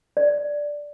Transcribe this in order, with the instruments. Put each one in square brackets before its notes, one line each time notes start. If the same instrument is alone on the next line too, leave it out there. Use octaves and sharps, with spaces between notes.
[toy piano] D5